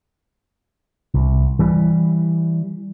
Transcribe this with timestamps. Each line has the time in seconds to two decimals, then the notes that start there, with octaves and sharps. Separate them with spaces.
1.14 C2
1.59 E3 G3